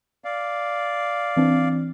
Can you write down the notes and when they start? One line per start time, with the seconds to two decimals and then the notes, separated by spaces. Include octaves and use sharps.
0.24 D5 F5
1.36 E3 C4 D4